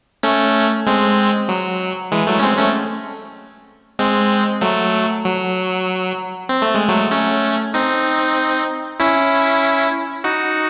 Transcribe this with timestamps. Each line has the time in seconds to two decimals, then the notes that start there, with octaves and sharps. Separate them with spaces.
0.23 A3 C#4
0.87 G#3 C4
1.49 F#3
2.12 E3 G#3
2.27 F#3 A3
2.39 C#4
2.43 G#3 C4
2.58 A3 C#4
3.99 G#3 C4
4.61 F#3 A3
5.24 F#3
6.49 C4
6.62 A3
6.74 G#3
6.88 F#3 A3
7.11 A3 C#4
7.74 C4 D#4
9.00 C#4 E4
10.24 D#4 F#4